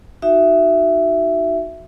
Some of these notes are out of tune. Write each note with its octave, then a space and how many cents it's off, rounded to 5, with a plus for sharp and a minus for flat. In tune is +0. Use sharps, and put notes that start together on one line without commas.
D#4 -5 F#4 +0 E5 +10